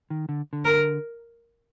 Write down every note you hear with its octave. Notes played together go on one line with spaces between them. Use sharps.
D#3
D3
D3
A#4